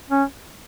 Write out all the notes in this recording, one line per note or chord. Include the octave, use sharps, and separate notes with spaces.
C#4